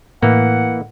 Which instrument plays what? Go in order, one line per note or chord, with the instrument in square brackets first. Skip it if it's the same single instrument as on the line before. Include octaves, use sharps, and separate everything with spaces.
[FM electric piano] A2 [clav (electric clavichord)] E3 A#3 [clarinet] F#5